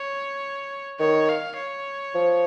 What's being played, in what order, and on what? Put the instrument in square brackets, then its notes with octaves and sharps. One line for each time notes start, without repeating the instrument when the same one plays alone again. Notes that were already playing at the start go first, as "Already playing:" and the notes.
Already playing: [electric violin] C#5
[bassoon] D#3 [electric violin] C#5
[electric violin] F5
C#5
[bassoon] F3